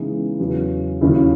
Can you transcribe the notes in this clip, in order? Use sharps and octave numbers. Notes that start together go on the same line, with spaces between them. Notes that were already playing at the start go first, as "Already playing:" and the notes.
Already playing: C#3 E3 G#3 B3 D#4
E2 C#3 F#3 C#4
D#2 C#3 F#3 C#4 E4